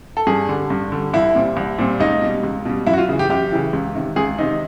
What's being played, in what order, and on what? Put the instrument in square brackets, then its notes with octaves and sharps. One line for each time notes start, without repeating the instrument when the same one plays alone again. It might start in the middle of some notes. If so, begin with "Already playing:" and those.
[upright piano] A4
G2 G#4
D3 G3
G2
D3 G3
C2 E4
A#2 G3 C4
C2
A#2 G3 C4
C#2 D#4
B2 G3
C#2
B2 G3
F#2 E4
F#4
F4
C#3 E3
G4
F#2 G4
C#3 E3
C#2
C3 D#3
C#2 G#4
C3 D#3 D#4